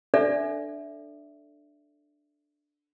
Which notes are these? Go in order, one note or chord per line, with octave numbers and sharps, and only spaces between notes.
D4 A4 D5 E5